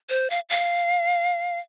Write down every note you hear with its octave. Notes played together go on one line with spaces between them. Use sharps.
C5
F5
F5